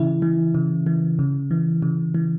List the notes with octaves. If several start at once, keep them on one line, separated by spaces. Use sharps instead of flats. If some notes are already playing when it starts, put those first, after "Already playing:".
Already playing: C#3 E3 E4
E3
C#3
E3
C#3
E3
C#3
E3